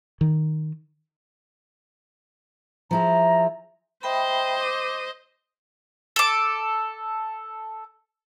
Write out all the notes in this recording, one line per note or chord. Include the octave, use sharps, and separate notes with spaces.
D#3
F3 E4 G#4 A#5
C5 D#5 E5 G5 B5
D6
A4 D6